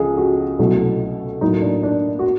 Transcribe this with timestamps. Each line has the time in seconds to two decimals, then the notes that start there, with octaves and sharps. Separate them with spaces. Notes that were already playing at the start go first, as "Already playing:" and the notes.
Already playing: C#2 C#3 F3 G#4 A4
0.17 F#4
0.59 C2 B2 F#3 A3
1.41 A2 F#3 A#3 D#4
1.62 D4
1.83 D4
2.19 F#4